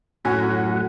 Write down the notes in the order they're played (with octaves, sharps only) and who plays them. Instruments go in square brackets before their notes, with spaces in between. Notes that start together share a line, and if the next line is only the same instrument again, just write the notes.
[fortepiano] F#2 G#5 [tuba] A2 [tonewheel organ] F#3 F#5